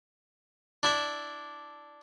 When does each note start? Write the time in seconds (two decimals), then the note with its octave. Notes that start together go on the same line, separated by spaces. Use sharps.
0.83 D4 E4 E5